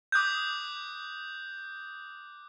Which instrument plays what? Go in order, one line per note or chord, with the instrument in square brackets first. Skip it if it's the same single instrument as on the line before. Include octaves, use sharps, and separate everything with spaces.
[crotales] D6 D#6 F#6 G6